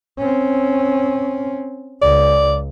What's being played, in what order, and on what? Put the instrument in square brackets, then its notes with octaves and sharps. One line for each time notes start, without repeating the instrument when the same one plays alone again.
[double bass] C4 C#4
[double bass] C#2 [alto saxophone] D5